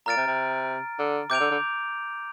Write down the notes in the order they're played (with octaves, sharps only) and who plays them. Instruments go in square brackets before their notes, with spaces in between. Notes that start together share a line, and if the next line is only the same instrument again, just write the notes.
[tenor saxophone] A#2 [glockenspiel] A#5 F6 A6 D7
[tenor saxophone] C3
C3
D3
[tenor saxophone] C3 [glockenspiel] D6 G6 D7 F7
[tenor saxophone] D3
D3